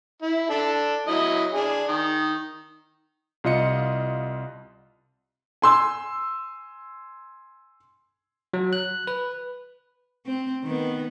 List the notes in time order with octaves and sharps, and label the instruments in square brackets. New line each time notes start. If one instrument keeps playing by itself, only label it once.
[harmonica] E4
D4 A4
F#3 E4 D#5
D4 G#4
D#3
[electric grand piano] C2 F4 D#5 C#7
[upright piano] G#5 C6 E6
[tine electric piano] F#3
F#6
B4
[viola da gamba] C4
D#3 B3